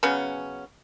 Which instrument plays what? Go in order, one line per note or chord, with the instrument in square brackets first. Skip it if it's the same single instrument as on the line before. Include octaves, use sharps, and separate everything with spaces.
[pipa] C#3 F#3 B3 C#4